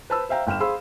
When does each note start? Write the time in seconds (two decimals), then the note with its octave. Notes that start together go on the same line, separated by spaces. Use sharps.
0.10 B4 C5 A5 B5 E6
0.29 C5 E5 F5 G5 A#5
0.47 G1 G5 F6 E7
0.60 G#4 C5 F5 B5 C6 E6